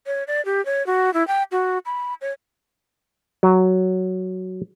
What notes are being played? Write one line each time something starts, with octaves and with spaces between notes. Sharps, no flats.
C#5
D5
G4
C#5
F#4
E4
G5
F#4
B5
C#5
F#3